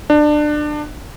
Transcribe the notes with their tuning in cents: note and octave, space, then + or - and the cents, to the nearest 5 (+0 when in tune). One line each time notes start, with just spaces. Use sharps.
D4 +25